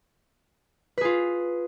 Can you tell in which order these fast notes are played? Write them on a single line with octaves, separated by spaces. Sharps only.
B4 G#4 F4